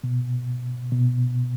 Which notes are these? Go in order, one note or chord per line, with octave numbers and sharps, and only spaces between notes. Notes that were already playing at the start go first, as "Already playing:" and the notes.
B2
B2